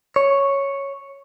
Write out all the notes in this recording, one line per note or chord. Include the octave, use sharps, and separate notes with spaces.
C#5